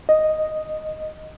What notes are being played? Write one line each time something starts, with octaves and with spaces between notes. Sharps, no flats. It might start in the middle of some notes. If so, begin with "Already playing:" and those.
D#5